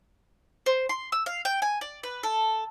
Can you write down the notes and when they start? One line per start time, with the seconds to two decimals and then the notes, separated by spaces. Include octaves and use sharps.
0.66 C5
0.89 C6
1.12 E6
1.26 F5
1.45 G5
1.62 G#5
1.81 D5
2.03 B4
2.23 A4